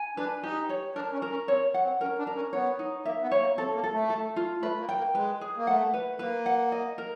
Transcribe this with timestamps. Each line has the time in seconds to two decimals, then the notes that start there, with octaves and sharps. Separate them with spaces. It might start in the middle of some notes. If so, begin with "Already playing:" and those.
Already playing: G#5
0.17 D4 B4
0.43 D#4 G4
0.69 C#5
0.95 D4 A#4
1.13 C#4
1.22 A#4
1.30 C#4
1.48 C4 C#5
1.74 F#5
1.83 C4
2.01 C#4 A#4
2.19 D4
2.27 A#4
2.36 C#4
2.53 B3 C#5
2.79 D#4
3.05 A#3 E5
3.22 B3
3.31 C#5
3.40 A#3
3.57 C4 A4
3.75 A#3
3.84 A4
3.93 A3
4.10 A4
4.36 F4
4.62 A3 B4
4.80 A#3
4.89 G5
4.97 A#3
5.15 G#3 B4
5.41 G#4
5.57 A#3
5.67 A3 F#5
5.93 B4
6.19 A#3 B4
6.46 F#5
6.72 D#5
6.98 A#4